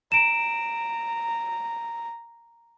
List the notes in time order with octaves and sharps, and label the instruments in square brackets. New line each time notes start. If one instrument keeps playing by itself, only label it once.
[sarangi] A#5 [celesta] D7 E7